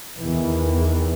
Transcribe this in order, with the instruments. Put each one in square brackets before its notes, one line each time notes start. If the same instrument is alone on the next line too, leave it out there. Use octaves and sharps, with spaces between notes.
[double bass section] E2 D#3 E3